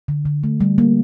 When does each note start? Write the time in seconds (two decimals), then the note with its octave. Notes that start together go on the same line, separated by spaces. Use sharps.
0.08 D3
0.25 D3
0.44 A3
0.61 G3
0.78 A#3